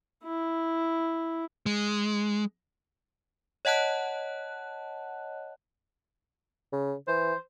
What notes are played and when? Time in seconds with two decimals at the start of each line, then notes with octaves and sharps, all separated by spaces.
0.24 E4
1.66 G#3
3.65 C#5 D#5 F#5 A5 F#6
6.73 C#3
7.08 E3 C5